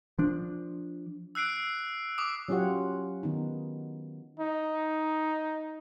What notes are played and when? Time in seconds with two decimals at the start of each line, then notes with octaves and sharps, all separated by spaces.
0.19 F3 D4
1.35 E6 F#6 C7 D7
2.18 D6 D#6
2.49 F#3 C#4 F4 G4 C#5 F#5
3.23 D#3 B3 D#4
4.39 D#4